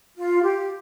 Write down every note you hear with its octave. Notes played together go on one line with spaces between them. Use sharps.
F4
G4